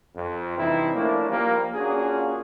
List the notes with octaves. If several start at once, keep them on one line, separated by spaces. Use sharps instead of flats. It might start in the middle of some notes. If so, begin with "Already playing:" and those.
F2
G2 C3 E3 C4 D#4 E4
F3 A3 A#3 C#4 D4 E4
F3 G3 A#3
A#3 C#4 D4 F4 F#4 G#4